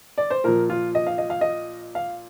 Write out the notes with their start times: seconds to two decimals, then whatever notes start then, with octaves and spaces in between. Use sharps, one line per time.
0.18 D5
0.30 C5
0.44 A#2 F3 A#4
0.70 F4
0.95 D#5
1.07 F5
1.18 D#5
1.30 F5
1.41 D#5
1.95 F5